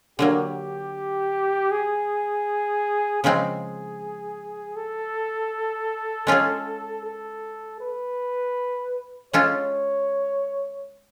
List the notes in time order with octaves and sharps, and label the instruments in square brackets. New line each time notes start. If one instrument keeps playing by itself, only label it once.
[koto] D3 F#3 A#3 [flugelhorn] G4
[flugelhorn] G#4
[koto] C#3 F3 G#3 C4 [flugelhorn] G#4
[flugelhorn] A4
[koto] G#3 C#4 F4 G#4
[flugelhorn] A4
B4
[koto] G#3 C#4 F4 A4 [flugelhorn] C#5